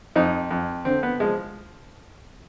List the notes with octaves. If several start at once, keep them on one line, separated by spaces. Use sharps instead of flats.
F2 D#4
F2
D3 C4
B3
F3 G#3